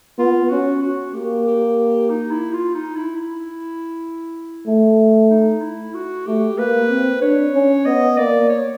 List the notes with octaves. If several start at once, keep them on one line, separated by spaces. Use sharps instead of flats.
B3 F4
C#4 F#4
F#4
A#3 G4
G4
D#4
E4
F4
D#4
E4
E4
A3
D#4
E4
F#4
A3 G4
A#3 B4
C4
D4 C#5
C#4
B3 D#5
A#3 D5
C#5